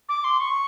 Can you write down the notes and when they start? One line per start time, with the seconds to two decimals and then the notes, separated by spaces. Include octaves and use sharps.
0.09 D6
0.24 C6
0.40 C#6